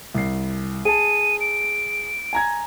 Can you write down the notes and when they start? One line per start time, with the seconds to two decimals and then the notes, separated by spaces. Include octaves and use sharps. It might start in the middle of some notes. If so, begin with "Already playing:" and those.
0.15 C2 C7
0.85 G#4 A5 D#7
1.41 D7
2.33 G#5 A#5 G#6